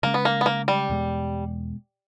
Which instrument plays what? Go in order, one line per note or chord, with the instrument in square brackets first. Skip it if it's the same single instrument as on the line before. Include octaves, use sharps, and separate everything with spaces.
[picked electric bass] C#3 G#3 C#4 [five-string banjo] A#3
[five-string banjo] B3
A#3
B3
A#3
G3
[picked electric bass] E2 B2 G#3